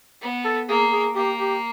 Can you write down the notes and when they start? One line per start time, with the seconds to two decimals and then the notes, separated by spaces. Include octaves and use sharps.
0.22 B3
0.44 A4
0.68 A#3 G#4
0.92 G#4
1.15 A#3 G4
1.40 G4